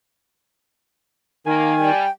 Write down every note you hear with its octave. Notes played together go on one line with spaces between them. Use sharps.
D#3 A#3 G#5
G3 G5